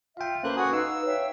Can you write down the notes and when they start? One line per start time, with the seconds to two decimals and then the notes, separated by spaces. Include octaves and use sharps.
0.17 F4 E5 F5 G5
0.44 A#3 C#4 A4 B4 C5 F#6
0.56 F#4 F#5 G#5 D#6 F#6
0.73 D#4 B4 F5 E6
1.05 C#5 E5 F5 G5